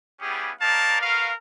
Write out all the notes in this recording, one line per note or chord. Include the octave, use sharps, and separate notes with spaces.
G3 B3 C#4 E4 G4 G#4
D#4 A#4 C#5 D5 F5 A5
F#4 A#4 B4 F5